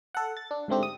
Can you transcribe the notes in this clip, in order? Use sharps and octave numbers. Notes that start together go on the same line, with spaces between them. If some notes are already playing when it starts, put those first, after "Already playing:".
A4 F#5
A6
D4
G#2 D3 A3 C4 G4
D#6